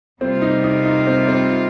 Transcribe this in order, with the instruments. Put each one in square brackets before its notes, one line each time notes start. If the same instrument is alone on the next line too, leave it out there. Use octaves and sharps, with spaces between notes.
[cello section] C3 G3 A#3 F4 [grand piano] C4
[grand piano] D#4
D#4
D#4
C4
C4